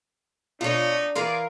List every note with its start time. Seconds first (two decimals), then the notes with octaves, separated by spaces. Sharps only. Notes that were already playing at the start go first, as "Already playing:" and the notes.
0.61 B2 A3 D4 D#4 F4 C#5
1.15 E3 G#4 A#4 D5 F5 A#5 C6